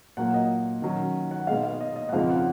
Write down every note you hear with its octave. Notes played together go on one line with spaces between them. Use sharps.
A#2 F#3 A#3 F#5
D#5
D#3 F#3 C#4
F#5
B2 G#3 D#4 F5
F5
D#5
D#5
F#5
F2 C#3 F3 G#3 D#4 F5
F#5